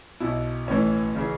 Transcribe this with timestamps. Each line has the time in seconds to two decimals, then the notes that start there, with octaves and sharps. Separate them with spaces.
0.20 B1 B2 E4
0.67 A1 A2 E3 C#4
1.16 C#3 E3